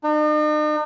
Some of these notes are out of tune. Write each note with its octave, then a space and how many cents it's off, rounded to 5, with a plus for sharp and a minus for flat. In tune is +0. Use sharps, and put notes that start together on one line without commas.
D#4 -45